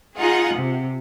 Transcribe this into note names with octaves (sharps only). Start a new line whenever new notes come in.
D#4 F4 G#4 F#5
C3